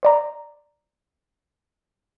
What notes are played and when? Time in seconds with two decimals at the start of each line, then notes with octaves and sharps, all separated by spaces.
0.03 C5 D5 A#5